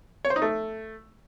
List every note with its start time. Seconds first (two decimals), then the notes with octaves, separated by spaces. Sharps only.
0.25 C#5
0.30 C5
0.36 D#4
0.42 A3